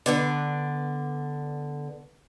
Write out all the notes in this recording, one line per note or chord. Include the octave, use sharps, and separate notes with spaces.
D3 B3 D4